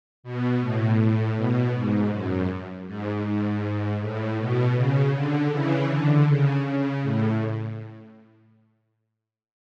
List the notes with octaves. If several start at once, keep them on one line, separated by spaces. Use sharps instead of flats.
B2
A2
A2
B2
G#2
F#2
G#2
G#2
A2
B2
C#3
D3
C#3 E3
D3
C#3
C#3
A2